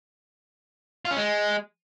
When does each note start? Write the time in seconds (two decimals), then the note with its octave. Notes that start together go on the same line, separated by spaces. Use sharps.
1.05 F4
1.11 C#4
1.16 G#3